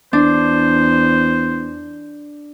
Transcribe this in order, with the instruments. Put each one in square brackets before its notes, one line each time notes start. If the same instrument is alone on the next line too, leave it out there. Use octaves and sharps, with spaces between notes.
[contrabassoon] E2 [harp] D4 [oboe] C5